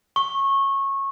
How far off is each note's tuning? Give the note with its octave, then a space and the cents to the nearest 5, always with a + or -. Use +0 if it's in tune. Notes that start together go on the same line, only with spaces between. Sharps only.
C#6 -20